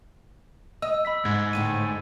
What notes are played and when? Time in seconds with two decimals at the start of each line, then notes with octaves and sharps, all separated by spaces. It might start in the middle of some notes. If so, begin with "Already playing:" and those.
0.82 D#5 E6
1.05 B5 E6 B6
1.25 G#2 G#6
1.53 D#2 A2 D3 D#7